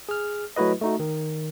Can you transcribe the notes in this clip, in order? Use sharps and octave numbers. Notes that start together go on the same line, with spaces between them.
G#4 F6
F#3 A3 E4 F#4 B4 D#5
A3 D#4 F#4
D#3